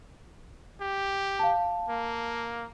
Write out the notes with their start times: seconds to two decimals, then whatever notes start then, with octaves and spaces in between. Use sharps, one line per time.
0.81 G4
1.39 F5 A5
1.88 A#3